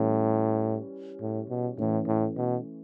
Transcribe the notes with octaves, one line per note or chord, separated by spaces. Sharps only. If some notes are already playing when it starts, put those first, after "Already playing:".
Already playing: A2 E3 G3 C#4
A2
B2
A2 E3 A3 C#4
A2
B2